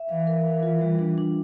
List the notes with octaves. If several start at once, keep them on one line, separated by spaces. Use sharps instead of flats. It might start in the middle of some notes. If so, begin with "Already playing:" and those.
Already playing: E5
E3 F5
A#4
E3 F5
F4
G3
D4
D4